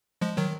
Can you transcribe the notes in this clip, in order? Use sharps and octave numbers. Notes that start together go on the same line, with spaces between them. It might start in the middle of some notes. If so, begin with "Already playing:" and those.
F3 G#3
D#3 F#3